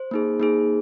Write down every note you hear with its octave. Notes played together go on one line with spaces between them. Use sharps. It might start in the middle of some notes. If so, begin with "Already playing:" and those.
Already playing: C5
A#3 D#4 G#4
A#3 D#4 G#4